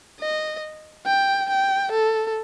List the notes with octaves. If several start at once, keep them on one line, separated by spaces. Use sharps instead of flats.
D#5
G5
G5
A4